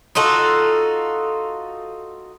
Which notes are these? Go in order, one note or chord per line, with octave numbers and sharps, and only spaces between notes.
D#4 F4 F#4 A4